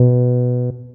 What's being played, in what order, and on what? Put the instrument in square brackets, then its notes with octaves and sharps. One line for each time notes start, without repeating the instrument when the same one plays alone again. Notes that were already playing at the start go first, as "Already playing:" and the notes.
Already playing: [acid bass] B2